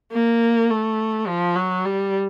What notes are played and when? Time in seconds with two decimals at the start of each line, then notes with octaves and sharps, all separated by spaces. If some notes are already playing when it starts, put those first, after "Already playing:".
0.12 A#3
0.70 A3
1.27 F3
1.56 F#3
1.86 G3